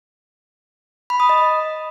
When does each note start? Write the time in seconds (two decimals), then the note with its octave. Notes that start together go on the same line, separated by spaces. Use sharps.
1.10 B5
1.20 D#6
1.29 D#5